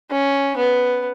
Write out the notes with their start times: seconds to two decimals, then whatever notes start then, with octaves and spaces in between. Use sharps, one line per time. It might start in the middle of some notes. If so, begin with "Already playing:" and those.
0.11 C#4
0.57 B3